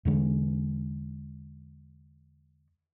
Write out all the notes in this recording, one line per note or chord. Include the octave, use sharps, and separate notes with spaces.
E2 D3 G#3